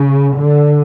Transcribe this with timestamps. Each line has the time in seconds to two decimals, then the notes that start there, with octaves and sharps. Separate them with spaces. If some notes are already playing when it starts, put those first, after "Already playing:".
Already playing: C#3
0.38 D3